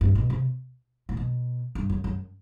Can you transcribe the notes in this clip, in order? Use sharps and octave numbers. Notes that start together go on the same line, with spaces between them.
G2
B2
C3
A2
B2
G2
F#2
F#2